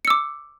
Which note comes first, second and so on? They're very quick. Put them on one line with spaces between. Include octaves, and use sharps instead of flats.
C#7 E6 D6